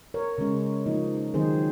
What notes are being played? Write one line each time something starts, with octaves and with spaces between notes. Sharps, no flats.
A#4 C#5
C#3 G#3 C#4
F3 A#3 D#4
D#3 F#3 C4 D#4 G#4 C5